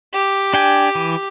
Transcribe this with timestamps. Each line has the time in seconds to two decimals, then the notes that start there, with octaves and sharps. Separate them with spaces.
0.14 G4
0.54 D4 G5 G#5
0.95 E3